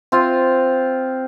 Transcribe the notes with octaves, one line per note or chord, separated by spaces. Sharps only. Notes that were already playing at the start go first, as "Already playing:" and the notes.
C4 F4